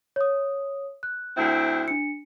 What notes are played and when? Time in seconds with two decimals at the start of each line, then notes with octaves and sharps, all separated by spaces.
0.16 C#5 D#6
1.03 F#6
1.36 D2 C4 E4
1.88 D4 C#7